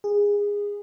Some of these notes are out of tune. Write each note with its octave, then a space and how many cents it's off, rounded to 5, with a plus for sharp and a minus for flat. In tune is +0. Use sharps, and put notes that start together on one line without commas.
G#4 -20